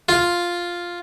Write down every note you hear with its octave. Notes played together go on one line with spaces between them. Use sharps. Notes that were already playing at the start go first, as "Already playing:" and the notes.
F4